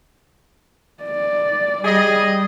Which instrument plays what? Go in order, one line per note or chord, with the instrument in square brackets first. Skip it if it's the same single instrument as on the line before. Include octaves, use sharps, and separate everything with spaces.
[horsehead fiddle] D5
[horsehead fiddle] G3 [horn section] G#4 D#5